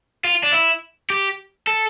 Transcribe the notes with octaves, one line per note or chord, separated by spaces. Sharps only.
F4
D4
E4
G4
A4